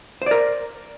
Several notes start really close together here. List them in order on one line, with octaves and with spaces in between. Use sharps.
C5 D5 A#4